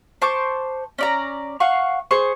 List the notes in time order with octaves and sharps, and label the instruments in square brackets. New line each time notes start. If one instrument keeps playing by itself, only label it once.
[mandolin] C5 A5 C#6 D6
C#4 D5 A#5
F5 F#5 C#6
G#4 C5 C#6